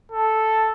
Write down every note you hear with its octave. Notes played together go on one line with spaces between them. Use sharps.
A4